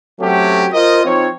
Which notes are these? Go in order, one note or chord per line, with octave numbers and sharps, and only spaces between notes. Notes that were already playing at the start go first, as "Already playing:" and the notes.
F#3 A3 C4 C#4 F#4 G4
F4 A#4 C5 D#5
F3 C4 D#4 C#5